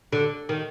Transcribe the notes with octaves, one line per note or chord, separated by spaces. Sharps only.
D3
D#3